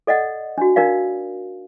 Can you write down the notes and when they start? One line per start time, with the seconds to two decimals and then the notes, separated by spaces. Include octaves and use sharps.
0.07 A4 D5 D#5 F#5
0.58 D4 F#4
0.76 D4 D#4 A#4 D5 F5